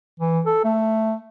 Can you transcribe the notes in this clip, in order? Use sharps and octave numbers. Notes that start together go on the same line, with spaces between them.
E3
A4
A3